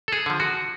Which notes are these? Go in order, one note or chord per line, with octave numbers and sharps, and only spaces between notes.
A4
G#4
D3 F3
F#4